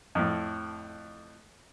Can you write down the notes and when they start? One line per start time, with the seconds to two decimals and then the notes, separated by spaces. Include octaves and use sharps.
0.15 F2 A2